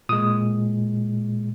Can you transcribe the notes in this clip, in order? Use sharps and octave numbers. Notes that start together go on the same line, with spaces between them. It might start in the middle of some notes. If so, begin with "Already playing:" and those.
A#2 G#3 D#6